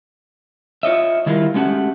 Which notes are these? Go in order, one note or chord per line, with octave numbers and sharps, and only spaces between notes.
F4 C#5 D#5 E5
D#3 G3 E4 F4 A#4
G#3 A3 C#4 F#4 G4 F#5